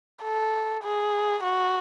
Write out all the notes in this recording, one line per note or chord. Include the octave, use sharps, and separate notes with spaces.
A4
G#4
F#4